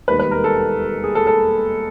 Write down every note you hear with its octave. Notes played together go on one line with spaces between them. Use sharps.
E1 D#2 D#3 G3 B4
B4
A#4
A4
G#4
A4
A4